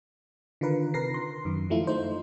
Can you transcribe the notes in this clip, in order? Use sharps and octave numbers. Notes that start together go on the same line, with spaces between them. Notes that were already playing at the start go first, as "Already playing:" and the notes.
D3 D#3 F4 A#4 B4
C3 A#4 B4 A#6 C7
C6
F#2 D#3
F3 A3 E4 F4
A3 D#4 C5